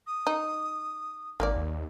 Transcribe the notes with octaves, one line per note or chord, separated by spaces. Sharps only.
D#6
D#4
G#1 D#3 A#3 D5
D#2